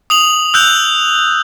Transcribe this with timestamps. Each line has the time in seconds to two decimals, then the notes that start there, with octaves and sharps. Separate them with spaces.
0.10 D#6 F7 F#7
0.54 E6 F#6 G6 F7